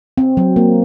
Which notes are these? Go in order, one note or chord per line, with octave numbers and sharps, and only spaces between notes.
C4
F#3
A#3